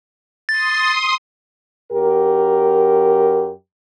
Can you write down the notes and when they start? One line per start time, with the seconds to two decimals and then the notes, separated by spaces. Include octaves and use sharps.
0.49 C6 D#6 A6
1.92 F#2 G4 A#4